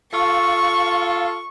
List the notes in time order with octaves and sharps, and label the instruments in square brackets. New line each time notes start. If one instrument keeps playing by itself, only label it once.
[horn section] F4 A4 [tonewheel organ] F5 [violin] C#6